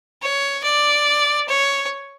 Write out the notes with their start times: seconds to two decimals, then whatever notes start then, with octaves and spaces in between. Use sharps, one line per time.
0.22 C#5
0.64 D5
1.49 C#5